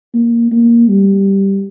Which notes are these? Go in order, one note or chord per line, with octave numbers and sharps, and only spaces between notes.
A#3
A#3
G3